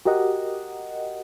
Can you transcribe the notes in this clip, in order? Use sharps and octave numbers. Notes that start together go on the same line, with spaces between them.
F#4 G4 A#4 D#5 F#5